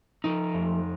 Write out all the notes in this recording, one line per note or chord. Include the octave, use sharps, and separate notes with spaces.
F3 D#4
F2